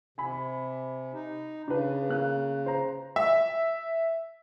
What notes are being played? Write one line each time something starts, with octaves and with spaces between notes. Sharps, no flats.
C3 G#5 B5
D#4
C#3 D4 B4
A#3 F#6
C5 A#5
E5